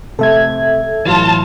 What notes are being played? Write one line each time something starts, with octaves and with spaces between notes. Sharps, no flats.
C3 A3 A4 E5 G#6
A2 E3 F#3 F4 A5